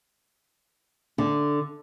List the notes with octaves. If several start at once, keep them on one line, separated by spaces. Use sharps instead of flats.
D3